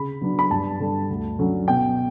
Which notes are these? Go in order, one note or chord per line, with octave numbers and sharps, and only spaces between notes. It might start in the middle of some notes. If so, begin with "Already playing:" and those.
Already playing: C#3 B5
F#3 B3 D4
B5
G2 A5
D3 G3
D2
D3 F#3 C#4
B2 G5